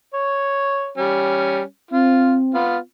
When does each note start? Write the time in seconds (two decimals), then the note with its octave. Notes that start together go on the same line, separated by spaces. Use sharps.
0.14 C#5
0.97 G3 C#4
1.91 C4 F4
2.54 B3 F4